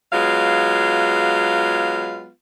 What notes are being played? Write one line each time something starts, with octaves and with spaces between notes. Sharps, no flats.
F#3 G#3 B3 F4 F5